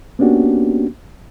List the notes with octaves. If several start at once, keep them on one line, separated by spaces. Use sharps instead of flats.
A#3 B3 C#4 D4 F#4 G4